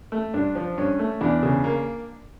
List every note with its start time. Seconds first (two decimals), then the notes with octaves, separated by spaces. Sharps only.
0.12 A3
0.34 G2 D4
0.55 F3
0.78 G2 C#4
0.99 A3
1.21 E2 D4
1.43 C#3
1.64 A#3